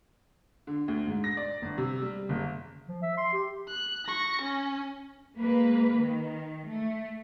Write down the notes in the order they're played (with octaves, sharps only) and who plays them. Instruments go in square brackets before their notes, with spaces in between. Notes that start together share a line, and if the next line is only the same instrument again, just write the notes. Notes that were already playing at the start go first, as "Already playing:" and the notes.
[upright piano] D3
D2
G#2
A#6
D5
G1
C3
G3
F#1
[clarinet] F3
E5
C6
G4
[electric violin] F#6
C#6 A#6
C#4
[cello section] G#3 A#3 B4
D#3
A3